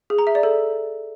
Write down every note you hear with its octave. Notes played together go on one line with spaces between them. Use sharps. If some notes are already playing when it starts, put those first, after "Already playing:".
G#4
A#5
E5
D5
A4